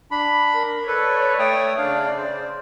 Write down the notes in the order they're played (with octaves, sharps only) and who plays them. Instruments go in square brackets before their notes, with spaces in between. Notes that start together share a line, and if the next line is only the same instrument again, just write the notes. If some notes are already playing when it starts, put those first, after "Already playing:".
[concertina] D4 B5
[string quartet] A#4
[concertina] A4 B4 [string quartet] C#5 D5
[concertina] A3 G5 D#6
[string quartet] C#3 D5 [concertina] D4 F5
[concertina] C5